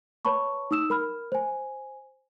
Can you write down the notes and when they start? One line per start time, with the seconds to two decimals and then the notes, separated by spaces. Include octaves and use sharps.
0.25 B4 C#5 A5 B5 C#6
0.71 D#4 D#6 E6 E7
0.90 A#4 B5 F6
1.32 C5 G#5